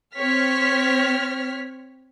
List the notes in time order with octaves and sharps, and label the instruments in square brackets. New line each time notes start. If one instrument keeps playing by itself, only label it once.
[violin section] C4 C#5 F6 B6